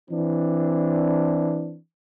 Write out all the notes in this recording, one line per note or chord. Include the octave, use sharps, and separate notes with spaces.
E3 C4 D4